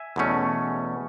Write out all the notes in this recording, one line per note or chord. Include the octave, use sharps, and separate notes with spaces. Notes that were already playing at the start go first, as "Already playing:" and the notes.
Already playing: E5 G#5
E2 B2 A3 C#4